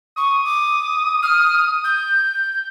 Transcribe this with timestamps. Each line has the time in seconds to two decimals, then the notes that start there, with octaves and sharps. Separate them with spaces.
0.17 C#6 D#6
0.45 D6
1.23 F6
1.84 G6